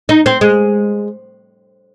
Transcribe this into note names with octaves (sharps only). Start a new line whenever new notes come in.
D#4
C4
G#3